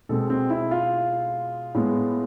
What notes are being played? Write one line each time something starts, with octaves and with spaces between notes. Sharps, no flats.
B2 G#3 C4 A4
C4
E4
F4
A2 G#3 B3